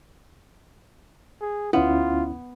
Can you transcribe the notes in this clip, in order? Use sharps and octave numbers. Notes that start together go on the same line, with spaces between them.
G#4
D2 B3 C#4 E4 F4